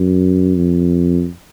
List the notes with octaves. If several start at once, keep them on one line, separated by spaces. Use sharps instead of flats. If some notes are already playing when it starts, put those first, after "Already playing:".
Already playing: F#2
F2